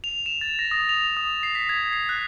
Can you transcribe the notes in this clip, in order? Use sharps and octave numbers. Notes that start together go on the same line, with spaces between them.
F7
E7
A6
A#6
D#6
F7
D#6
C7
B6
G#6
C7
F#6